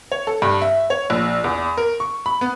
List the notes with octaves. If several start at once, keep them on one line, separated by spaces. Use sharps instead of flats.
C#5
A4
G2
E5
C#5
A#1
E2
A#4
C#6
B5
B3